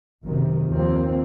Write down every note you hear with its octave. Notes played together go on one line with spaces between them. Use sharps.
F#1 C3 D#3
D#2 F3 A#3 C4